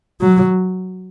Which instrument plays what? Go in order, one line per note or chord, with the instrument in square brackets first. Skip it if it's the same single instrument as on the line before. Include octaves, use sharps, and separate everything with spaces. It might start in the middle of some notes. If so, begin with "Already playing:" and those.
[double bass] F#3